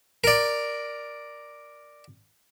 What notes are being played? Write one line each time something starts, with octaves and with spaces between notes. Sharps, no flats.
A#4 D5